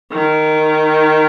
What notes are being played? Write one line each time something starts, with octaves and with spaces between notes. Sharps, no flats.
D#3